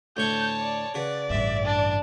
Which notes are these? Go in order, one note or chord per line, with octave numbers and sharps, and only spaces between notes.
D2 A2 C#5 A5 C#6 G6
D5
C#3 F#4 B4 D5
A1 G2 E5
D4